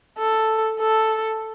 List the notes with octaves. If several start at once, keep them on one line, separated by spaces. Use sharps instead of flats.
A4
A4